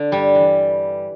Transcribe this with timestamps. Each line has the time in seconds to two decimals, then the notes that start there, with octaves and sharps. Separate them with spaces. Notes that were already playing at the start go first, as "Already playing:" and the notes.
Already playing: D3
0.12 G2 G3
0.35 E3